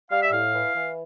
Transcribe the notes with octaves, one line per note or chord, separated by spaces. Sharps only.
G3 F5
E5
A2 F5
E3
E3